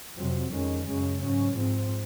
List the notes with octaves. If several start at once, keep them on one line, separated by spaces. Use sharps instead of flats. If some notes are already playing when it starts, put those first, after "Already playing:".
F2 C3 F#3 C4
F2 D#3 G#3 C#4
F#2 C#3 G#3 C#4
G#2 F#3 C#4
G#2 F3 C4